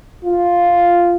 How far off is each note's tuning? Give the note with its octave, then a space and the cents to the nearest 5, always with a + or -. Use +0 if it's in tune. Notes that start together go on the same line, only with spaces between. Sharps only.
F4 +0